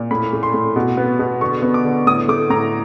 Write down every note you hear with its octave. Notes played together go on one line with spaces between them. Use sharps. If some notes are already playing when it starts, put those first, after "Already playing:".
Already playing: A#2
A2 B5
A3
C6
A2
B2
B3
B2
D3 C#6
B3
D6
D3
A2 D#6
A3 D6
A2 A#5